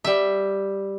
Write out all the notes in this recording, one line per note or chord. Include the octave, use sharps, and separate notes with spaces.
G3 E5